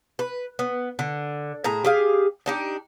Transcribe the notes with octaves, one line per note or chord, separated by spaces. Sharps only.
B4
B3
D3
A2 G#4 A#5
G4 G#4 F5
D4 D#4 G4